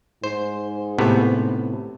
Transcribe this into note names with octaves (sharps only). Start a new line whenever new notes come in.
G#2 C5
A2 C3 B3